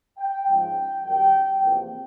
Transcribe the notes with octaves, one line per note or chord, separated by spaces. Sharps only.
G5
G#2 F3 G#3 C#4 F4 G5
F#2 D#3 G3 G5
E2 C3 F3 A#3